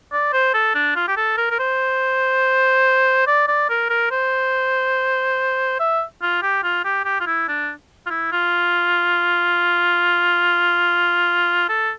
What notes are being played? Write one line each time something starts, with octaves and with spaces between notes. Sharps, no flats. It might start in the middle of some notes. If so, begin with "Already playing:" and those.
D5
C5
A4
D4
F4
G4
A4
A#4
A#4
C5
D5
D5
A#4
A#4
C5
E5
F4
G4
F4
G4
G4
F4
E4
D4
F4
E4
F4
A4